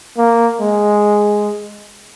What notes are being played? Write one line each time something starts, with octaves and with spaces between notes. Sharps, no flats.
A#3
G#3